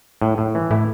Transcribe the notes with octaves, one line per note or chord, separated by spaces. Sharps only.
A2
A2
E3
A2 E4